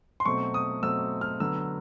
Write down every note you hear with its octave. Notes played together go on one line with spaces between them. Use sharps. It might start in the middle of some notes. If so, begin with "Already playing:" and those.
C6
B2 F#3 A3 C4 C#6
D#6
B2 F#3 A3 C4 E6
F6
D3 F#3 B3 E6